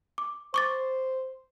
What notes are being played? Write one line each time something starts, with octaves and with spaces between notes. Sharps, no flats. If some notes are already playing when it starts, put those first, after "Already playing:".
D6
C5 C#6 D6 A6